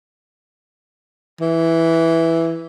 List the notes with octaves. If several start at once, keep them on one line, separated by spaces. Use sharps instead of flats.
E3